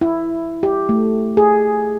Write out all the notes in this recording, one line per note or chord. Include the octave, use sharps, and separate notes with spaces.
E4
G4
A3
G#4